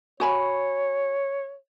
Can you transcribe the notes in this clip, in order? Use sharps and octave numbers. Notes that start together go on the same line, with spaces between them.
F#4 C#5 G#5 B5